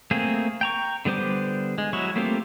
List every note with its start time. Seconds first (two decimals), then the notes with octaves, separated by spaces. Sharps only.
0.11 A3 A#3 C4 G#4
0.61 G5 A#5 C#6
1.05 D3 G3 B3 C5 D6
1.78 G#3
1.93 F#3 G#3 E4 C#6
2.16 A3 A#3 C4 F4 G4